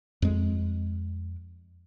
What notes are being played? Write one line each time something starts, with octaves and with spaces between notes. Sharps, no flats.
F2 G#3